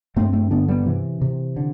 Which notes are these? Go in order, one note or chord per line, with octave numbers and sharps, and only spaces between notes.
G2 A3 C4
A3 C4
D3 B3 D4
G3 B3
C3 E3
C3
D3